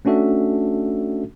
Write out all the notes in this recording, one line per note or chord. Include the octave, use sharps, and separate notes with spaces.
A3 C#4 D4 F#4 A4 E5